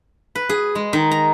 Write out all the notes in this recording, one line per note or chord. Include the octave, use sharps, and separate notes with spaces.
B4
G#4
G#3
D#3
A#5